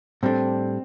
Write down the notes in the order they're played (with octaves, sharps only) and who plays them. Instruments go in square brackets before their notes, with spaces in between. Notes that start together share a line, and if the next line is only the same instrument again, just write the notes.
[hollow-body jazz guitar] A2 G3 D4 A4 [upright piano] C4